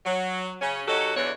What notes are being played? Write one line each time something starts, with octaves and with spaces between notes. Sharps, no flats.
F#3
C#3 C#4
F#3 D#4 F#4 G4 A4
E2 D3 E3 B3 C#5